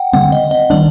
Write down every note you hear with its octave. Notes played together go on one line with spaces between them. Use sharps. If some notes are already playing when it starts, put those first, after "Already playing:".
Already playing: F#5 G5
D3 G3 C4 F#5
D#5
D#5
D#3 G3 D4 D5